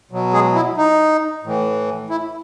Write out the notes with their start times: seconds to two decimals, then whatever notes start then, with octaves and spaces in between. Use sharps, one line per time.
0.11 B2 F#3
0.33 G#3 G#4
0.55 E4
0.77 D#4
1.44 A2 E3
2.10 E4